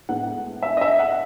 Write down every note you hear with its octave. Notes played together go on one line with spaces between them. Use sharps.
A2 G#3 B3 F#5
E5
D#5
E5
F#5